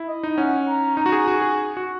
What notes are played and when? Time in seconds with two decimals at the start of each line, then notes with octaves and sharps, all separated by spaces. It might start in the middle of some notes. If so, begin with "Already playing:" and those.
Already playing: E4
0.08 D#5
0.23 D#4
0.38 C#4 F#5
0.68 A#5
0.97 D#4 A#5
1.06 F#4
1.12 G#4
1.27 F#4 G#5
1.42 G#4
1.77 F#4